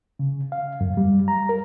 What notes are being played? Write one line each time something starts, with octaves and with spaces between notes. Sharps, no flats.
C#3
F5
F#2
G3
A#5
A#4